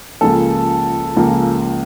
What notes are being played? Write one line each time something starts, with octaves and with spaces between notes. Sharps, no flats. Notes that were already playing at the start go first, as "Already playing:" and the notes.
C#2 C#3 F3 A#3 A4
C#2 C#3 F3 A#3